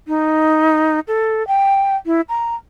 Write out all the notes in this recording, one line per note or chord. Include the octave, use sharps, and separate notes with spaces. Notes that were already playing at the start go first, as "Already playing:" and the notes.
D#4
A4
G5
E4
A#5